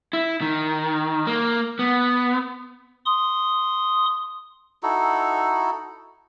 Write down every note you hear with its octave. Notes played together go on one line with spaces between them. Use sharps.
E4
D#3
A#3
B3
C6 D#6
D#4 E4 F#4 A4